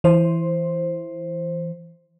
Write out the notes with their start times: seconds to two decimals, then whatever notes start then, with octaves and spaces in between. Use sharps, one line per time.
0.04 E3 C5